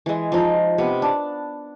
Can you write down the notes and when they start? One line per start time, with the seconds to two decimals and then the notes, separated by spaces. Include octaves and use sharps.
0.06 E3 G#3
0.32 F3 D#4
0.78 C3 B3
1.02 D4